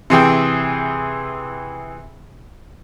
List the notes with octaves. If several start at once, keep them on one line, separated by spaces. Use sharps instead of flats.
C3 E3 G#4 G5